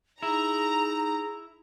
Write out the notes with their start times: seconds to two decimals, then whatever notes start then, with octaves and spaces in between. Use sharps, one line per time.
0.23 D#4 E4 G#4 A#5